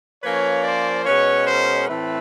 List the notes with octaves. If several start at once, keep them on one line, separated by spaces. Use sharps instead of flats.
F3 A#3 C#4 B4 C#5
C5 D5
B2 G#3 C#4 B4 C#5
A#4 C5
A2 E3 A3 C4 A4 B4